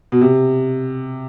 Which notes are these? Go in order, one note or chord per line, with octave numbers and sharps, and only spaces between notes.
B2
C3